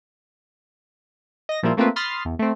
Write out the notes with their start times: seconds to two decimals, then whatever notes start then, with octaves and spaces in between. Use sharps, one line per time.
1.49 D#5 A#6
1.63 A#2 F3 G3 A#3 E4 F4
1.77 A3 A#3 C4 F4 B4
1.96 B5 C6 D#6 F6 A6 C7
2.25 E2
2.39 A3 C4